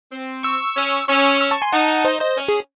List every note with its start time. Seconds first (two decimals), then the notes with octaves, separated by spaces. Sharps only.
0.12 C4
0.43 C#6 E6
0.76 C#4
1.09 C#4 C#6 E6
1.41 C#6 E6
1.51 A5 C#6
1.62 G#5 C6
1.72 D#4 F#5 A5
2.05 C5 D#5
2.21 C5 D#5
2.37 C#4
2.49 G#4